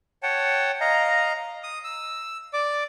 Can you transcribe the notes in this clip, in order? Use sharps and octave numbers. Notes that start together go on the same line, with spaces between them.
C#5 F#5 G5 A5
D#5 F5 A#5
D#6
E6
D5 D6